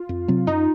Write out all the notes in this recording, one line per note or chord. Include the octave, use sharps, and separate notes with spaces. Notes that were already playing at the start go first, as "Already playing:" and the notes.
Already playing: F4
F2
C3 F#3 C4
F#2 D#4